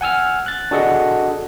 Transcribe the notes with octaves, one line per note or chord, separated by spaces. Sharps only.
F#5 G#5 E6 F6
F#6 A6
D4 F#4 G#4 A4 D#5 F#5